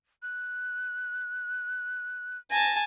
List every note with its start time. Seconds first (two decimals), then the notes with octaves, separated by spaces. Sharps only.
0.22 F#6
2.51 G#5 A5 A#6